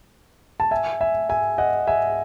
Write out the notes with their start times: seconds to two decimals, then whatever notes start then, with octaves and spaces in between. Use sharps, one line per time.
0.60 A5
0.71 E5 G#5
1.01 E5 G#5
1.29 E5 G#5
1.58 D#5 F#5
1.87 E5 G#5